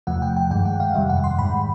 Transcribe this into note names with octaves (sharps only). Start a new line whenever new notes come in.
E2 C3 F3 A3 F#5
G5
G5
G2 D#3 G#3 G5
F#5
F5
F2 C3 D#3 G3 E5
F#5
C6
G#2 D#3 G#3 B5